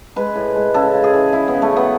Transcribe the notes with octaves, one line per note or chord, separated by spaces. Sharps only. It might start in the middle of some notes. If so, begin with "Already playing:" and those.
G#3 B4
A2
G#3
C#3 A4
C#3
G#4
E3
C#3 E4
B3
C#3
A3
F#3 B3